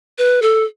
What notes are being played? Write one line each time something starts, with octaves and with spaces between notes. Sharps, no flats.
B4
A4